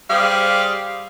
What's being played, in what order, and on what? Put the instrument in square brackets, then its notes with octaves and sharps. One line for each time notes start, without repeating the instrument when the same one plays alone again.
[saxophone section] G3 G4 G#4 C5 F5